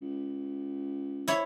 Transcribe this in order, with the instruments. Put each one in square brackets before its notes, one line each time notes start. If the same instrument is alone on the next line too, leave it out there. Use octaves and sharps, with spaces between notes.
[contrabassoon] C#2
[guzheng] E4 C#5